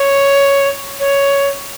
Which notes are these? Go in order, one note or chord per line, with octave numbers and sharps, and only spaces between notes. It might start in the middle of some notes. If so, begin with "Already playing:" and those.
Already playing: C#5
C#5